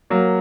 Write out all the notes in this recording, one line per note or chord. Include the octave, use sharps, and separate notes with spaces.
F#3 A#3